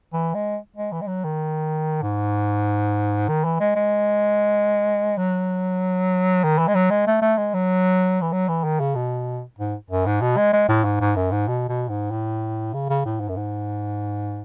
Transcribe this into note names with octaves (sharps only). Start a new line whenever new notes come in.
E3
G#3
G#3
E3
G#3
F#3
D#3
G#2
D#3
E3
G#3
G#3
F#3
D#3
E3
G#3
F#3
G#3
A3
A3
G#3
F#3
E3
F#3
E3
D#3
C#3
B2
G#2
F#2
G#2
B2
G#3
G#3
A2
G#2
G#2
F#2
G#2
B2
B2
G#2
A2
C#3
C#3
A2
G#2
F#2
G#2